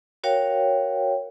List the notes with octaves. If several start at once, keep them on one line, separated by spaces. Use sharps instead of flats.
F#4 A#4 C#5 F5 G5